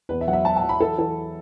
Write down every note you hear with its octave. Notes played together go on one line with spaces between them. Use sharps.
E2 B4
E5
F#3 F#5
E5
F#3 A5
A5
F#3
B5
E3 A4
E3 A4